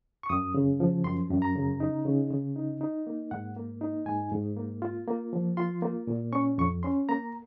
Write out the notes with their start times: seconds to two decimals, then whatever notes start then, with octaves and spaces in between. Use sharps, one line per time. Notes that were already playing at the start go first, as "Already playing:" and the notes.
0.23 C#6
0.29 F#2 D#6
0.54 C#3
0.80 F3
1.04 F#2 C6
1.30 F#2
1.42 A#5
1.55 C#3
1.80 D#4
2.05 C#3
2.30 C#3
2.56 D#4
2.81 D#4
3.07 A#3
3.31 G#2 F#5
3.56 A#3
3.81 D#4
4.06 G#2 G#5
4.32 G#2
4.56 A#3
4.82 F4
5.07 A#3
5.33 F3
5.57 F4 C6
5.82 A#3
6.07 A#2
6.33 C#4 C#6
6.58 F2 C#6
6.83 C#4 C6
7.09 A#3 A#5